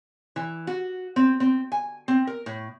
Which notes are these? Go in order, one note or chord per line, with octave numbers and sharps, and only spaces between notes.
E3
F#4
C4
C4
G#5
C4
A#4
A2